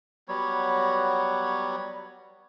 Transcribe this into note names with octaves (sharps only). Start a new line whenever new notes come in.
F#3 G3 B3 C#5